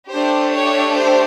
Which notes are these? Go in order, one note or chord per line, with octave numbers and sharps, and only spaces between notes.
A3 D4 G4 C5
C#5
C5